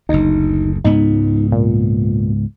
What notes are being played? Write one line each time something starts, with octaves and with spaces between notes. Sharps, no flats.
F#1 D2 D#4
C#2 G#2 B3 D#4
A#2